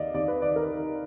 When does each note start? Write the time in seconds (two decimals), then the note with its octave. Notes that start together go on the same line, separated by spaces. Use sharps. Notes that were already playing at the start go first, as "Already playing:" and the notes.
Already playing: D#2 D#3 D5 D#5 F5
0.14 D#2 D5
0.28 B4
0.42 D#3 D5
0.56 A#4
0.70 D#3